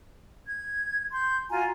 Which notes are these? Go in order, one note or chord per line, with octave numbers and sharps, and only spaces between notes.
G#6
C6 G6
F4 F#4 G#5 A#5